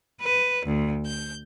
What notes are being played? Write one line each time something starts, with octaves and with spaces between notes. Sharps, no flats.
B4
D2
G6